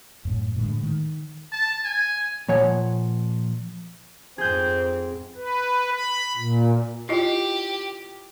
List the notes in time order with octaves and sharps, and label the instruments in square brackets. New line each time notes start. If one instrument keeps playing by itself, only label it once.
[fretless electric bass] F#2 A2
A2 D3 G#3
D#3
[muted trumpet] A5
G#5
[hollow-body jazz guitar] A#2 F3 C#5 F#5 G#5
[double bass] F2 G#2 [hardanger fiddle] C4 [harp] G#4 G6
[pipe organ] B4
B5
A#2
[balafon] E4 F4 D#5 [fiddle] G4